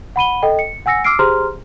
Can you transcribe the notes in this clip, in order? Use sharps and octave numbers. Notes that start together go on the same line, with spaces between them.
F#5 B5 D#7 G7
A4 D#5 G5
C#7
F#5 G#5 E6 A#6 C#7
D6 E6 F6 C7 D7
G4 G#4 C5 A#5 C6 F6